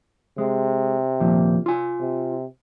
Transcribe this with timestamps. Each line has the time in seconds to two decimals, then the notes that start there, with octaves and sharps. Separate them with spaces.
0.38 C3 G#3
1.20 D#2 A#2 F3
1.66 F4 G#5
2.00 C3